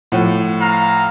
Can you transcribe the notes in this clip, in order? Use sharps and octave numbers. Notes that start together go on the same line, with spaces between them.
A2 F3 F#5
F5 A#5